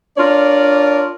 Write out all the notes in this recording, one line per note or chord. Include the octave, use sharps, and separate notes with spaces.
D4 F4 A#4 C#5 D5